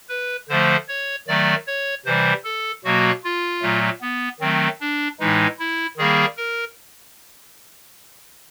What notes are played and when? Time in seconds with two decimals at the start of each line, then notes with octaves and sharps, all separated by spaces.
0.09 B4
0.49 D3 F3 A3 C5
0.88 C#5
1.28 D#3 F#3 A3 D5
1.67 C#5
2.06 C3 E3 G3 C5
2.44 A4
2.84 B2 F#3 A#3 F#4
3.24 F4
3.62 A#2 F#3 A3
4.01 B3
4.40 D#3 F#3 A3 C4
4.81 D4
5.20 A2 E3 G#3 D#4
5.59 E4
5.97 D#3 G3 A#3 G#4
6.37 A#4